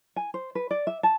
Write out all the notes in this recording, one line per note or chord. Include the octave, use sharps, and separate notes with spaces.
G#5
C5
B4
D5
E5
A5